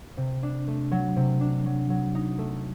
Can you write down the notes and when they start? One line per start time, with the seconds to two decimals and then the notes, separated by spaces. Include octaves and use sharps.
0.17 C3
0.43 D4
0.68 A3
0.91 F#3
1.16 C3
1.41 D4
1.66 F#3
1.90 F#3
2.15 D#4
2.39 A3